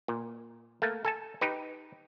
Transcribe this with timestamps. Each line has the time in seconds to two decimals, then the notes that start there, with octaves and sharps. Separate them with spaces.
0.08 A#2
0.82 A3 A#3
1.05 A4 G#5 A5
1.41 D#4 G4 B4